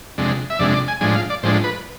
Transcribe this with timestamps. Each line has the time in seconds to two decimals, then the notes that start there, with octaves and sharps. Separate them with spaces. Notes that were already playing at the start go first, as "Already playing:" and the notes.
0.18 F2 C3 G#3 D4
0.50 E5
0.59 F2 C3 G#3 D4 D5
0.74 D5
0.88 G#5
1.01 A2 F3 G#3 D4 G#5
1.16 F5
1.30 D5
1.43 A2 F3 G#3 D4 C5
1.64 B4